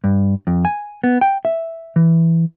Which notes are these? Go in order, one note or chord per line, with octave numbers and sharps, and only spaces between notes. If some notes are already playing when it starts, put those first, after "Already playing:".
G2
F2
G#5
B3
G5
E5
E3